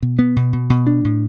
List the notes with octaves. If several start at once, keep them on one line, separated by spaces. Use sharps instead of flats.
B2
B3
B2
B2
B2
D4
A2